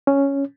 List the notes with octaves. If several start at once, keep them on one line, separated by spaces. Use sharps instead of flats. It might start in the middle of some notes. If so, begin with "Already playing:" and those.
C#4